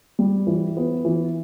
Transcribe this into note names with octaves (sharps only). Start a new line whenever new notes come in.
G3
E3
B3
E3